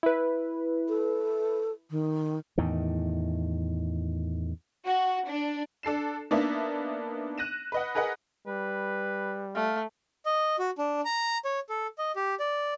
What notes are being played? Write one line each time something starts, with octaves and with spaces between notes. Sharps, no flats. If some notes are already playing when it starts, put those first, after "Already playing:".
E4 B4
A4
D#3
E2 A2 D#3
F#4
D4
D4 A4 C7 E7
A#3 B3 D4 D#4 E5
F#6 A#6 D#7 E7
B4 D#5 F#5
G#4 A#4 B4 D#5 F#5
G3 B4
A3 F5
D#5
F#4
D4
A#5
C#5
A4
D#5
G4
D5